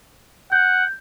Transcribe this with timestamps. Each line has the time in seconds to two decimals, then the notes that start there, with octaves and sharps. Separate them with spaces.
0.52 F#5 G6